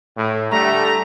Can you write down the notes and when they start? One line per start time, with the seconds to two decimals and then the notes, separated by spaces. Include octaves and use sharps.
0.17 A2
0.51 D3 G3 A3 A#5